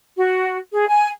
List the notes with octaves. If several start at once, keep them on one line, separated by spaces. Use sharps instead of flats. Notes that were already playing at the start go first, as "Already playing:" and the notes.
F#4
G#4
G#5